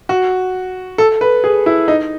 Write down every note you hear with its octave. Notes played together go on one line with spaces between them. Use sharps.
F#4
A4
B4
G#4
E4
D#4